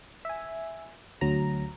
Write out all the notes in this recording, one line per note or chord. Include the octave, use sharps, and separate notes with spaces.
E5 G#5
D2 F#3 A#5